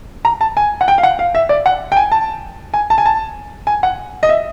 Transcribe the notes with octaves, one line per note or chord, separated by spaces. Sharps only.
A#5
A5
G#5
F#5
G5
F5
F#5
F5
E5
D5
F#5
G5
G#5
A5
G#5
A5
G#5
A5
G#5
F#5
D#5
E5